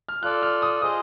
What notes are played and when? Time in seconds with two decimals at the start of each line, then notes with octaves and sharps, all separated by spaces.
0.09 F6
0.23 F4 A4 D5 F#6
0.43 F6
0.62 D#6
0.81 F4 G#4 C5 D#5 D#6